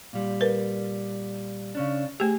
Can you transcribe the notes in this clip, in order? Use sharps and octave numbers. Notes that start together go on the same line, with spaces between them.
A#2 G3
A#4 B4
C#3 C#4 D4
A3 G4 G#4